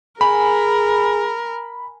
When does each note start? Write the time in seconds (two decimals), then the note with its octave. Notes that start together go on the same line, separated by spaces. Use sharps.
0.21 G#4 A#4 G#5 B5